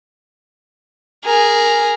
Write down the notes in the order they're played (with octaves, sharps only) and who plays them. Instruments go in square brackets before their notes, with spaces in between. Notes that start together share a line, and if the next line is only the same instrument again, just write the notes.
[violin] G#4 A#4